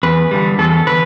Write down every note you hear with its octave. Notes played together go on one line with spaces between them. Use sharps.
E2 B4
D3 G3
E2 A4
D3 B4